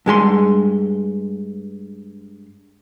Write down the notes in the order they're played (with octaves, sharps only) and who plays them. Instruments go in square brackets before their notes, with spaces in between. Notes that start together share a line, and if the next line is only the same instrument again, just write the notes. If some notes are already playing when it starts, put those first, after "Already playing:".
[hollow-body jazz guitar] G2 G#3 G4 C6